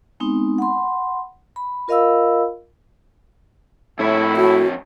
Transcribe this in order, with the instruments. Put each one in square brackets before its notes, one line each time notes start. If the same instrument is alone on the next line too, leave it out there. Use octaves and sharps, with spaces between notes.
[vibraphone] G#3 B3 C4 D#4
F#5 B5 C6
B5
F4 A#4 D#5 F5 B5 E6
[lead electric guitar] F2 C#5 [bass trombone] A2 [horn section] E4
[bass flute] F#4